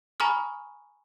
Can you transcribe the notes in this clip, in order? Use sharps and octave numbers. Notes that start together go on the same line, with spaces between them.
G#5 A#5 B5 C#6 D#6 F6